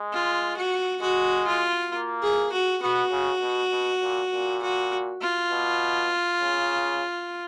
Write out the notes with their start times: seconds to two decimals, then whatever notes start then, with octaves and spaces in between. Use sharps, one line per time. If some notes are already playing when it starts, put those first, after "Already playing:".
Already playing: G#3
0.13 F4
0.57 F#4
1.02 G#3 F#4
1.47 F4
1.92 A#3
2.22 G#4
2.52 F#4
2.82 B3 F#4
3.12 C#3
3.42 B2
3.71 B2
4.02 A#2
4.32 A#2
4.62 F#4
5.21 F4
5.51 B2
6.41 C#3